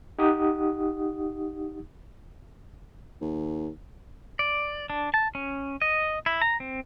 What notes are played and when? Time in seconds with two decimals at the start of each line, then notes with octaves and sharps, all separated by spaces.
0.19 D#4 G4 F#5 D#6
3.21 D#2
4.39 D5
4.90 D4
5.14 A5
5.35 C#4
5.82 D#5
6.26 E4
6.42 A#5
6.60 C4